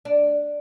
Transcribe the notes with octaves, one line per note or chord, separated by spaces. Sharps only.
D4